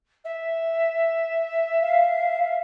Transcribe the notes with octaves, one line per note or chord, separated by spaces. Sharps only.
E5
F5